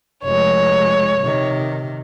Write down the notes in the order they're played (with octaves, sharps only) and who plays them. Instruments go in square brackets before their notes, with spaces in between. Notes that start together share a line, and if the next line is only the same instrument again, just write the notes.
[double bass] F1 G#3 [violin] C#5
[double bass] C3 D#3